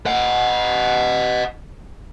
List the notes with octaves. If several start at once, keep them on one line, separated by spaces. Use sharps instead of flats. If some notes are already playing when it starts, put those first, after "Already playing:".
D#5 F#5